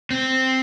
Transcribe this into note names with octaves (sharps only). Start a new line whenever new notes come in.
C4